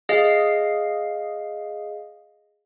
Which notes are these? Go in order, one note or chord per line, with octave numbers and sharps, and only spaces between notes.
G#4 D#5 F5 C7